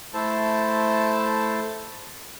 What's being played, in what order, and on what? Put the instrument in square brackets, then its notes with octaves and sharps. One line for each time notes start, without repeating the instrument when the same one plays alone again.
[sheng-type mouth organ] A3 E4 A4 C5 A5